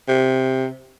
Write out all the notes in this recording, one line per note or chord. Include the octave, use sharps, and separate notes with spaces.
C3